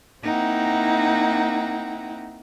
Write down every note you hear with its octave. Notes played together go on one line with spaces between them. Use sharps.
A#3 C4 D#4 E4 F#5 G5